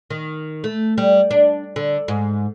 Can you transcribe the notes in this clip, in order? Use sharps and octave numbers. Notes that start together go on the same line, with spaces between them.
D#3
A3
G3
D4
D3
G#2